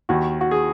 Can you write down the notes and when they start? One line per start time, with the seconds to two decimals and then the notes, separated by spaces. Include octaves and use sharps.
0.09 D#2 F#4
0.41 F#4
0.51 G#4